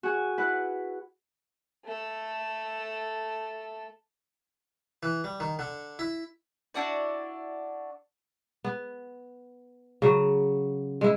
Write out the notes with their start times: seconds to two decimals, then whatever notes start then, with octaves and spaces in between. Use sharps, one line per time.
0.03 F#4 G#4 G#5
0.38 E4 B4 F#5 F#6
1.85 A3 A4
5.03 E3
5.24 G3
5.40 D#3
5.59 D3
5.99 E4
6.74 D4 E4 F#4 D5
8.65 B3
10.02 C#3 F#3
11.01 G#3 E4